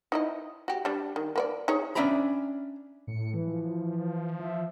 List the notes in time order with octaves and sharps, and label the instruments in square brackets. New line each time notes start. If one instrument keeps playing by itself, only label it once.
[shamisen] D#4 E4 D#5
F#4 G4
G3 D4
D#3
A#3 B4 D5
D#4 G#4 C#5
[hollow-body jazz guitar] C#4 D4 E5 G5 A#5 B5
[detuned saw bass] A2 [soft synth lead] C#7
[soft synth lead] E3
[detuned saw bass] F3
[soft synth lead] E5